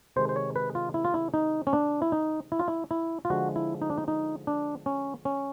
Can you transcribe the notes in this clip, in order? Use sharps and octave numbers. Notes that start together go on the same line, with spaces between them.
C3 D#3 G#3 C5
C5
C#5
B4
F4
E4
F4
E4
D#4
C#4
D4
E4
D#4
E4
F4
E4
E4
F4
D3 F3 G#3 F#4
E4
D#4
D4
D#4
D#4
D4
C#4
C#4